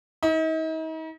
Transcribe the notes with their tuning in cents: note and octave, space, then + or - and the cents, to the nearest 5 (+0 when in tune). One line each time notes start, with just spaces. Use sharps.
D#4 +40